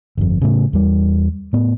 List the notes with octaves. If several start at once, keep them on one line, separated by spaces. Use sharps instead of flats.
G1 F2
A2 C#3
E2 G3
A2 B3